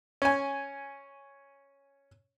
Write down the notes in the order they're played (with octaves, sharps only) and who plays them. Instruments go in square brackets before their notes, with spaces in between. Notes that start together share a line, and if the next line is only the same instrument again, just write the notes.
[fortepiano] C#4 G#5